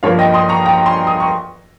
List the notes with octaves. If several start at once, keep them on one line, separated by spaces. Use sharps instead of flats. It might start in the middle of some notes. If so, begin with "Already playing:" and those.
G2 F3 A#3 C#5 F5
D#5 G5
C6 D#6
A#5 C#6
G5 A#5
G#5 C6
D#6
C#6